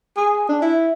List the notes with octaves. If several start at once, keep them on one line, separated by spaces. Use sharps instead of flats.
G#4
D4
E4